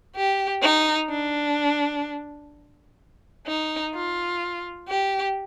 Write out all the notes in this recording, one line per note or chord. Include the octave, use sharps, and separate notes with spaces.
G4
D#4
D4
D#4
F4
G4